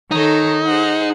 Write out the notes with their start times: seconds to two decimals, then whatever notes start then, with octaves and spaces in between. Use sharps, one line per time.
0.11 D#3 D#4 A4 C#5
0.66 G#4 C5 F#5